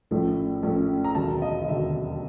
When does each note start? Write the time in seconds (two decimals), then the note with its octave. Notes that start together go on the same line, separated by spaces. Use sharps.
0.11 A#1 A2 F3 A3 C#4
0.63 A#1 A2 F3 A3 C#4
1.04 A#5
1.15 E1 D#2 D3 F#3 A5
1.42 D#5
1.62 D#5
1.68 E1 D#2 D3 F#3 E5